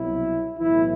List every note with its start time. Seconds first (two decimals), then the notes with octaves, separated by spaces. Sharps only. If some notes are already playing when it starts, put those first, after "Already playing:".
Already playing: C2 B2 F#3 E4
0.58 B1 A2 E3 E4